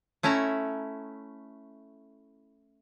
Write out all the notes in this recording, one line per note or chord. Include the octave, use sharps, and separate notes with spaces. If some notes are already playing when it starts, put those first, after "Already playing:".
A3 C#4 E4 E5 A#5